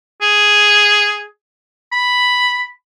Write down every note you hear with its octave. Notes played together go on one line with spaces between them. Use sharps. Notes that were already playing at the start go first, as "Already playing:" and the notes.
G#4
B5